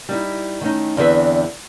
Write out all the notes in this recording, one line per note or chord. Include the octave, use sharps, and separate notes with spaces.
G3 D#4 E4
D#3 A3 B3 C#4 D#4
E2 D3 C4 G#4 B4 E5